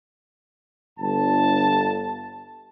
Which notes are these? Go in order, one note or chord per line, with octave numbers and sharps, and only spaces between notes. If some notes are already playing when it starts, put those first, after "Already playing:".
G1 A5